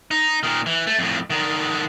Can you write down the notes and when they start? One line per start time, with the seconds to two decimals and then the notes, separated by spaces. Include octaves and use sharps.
0.11 D#4
0.43 A#2 D#3
0.66 E3
0.87 A3
0.99 F2 A2
1.30 D3 D#3